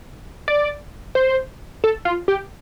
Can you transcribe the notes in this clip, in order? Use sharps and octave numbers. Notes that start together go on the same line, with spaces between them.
D5
C5
A4
F4
G4